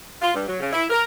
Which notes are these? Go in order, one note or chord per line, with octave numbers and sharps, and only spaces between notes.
F4
G2
F#3
C#3
E4
A#4